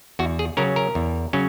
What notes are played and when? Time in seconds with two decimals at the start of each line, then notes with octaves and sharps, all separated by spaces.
0.19 E2 F#4
0.39 G#4
0.57 C#3 F#3 C#4 A#4
0.76 A#4
0.95 E2
1.33 C#3 F#3 C#4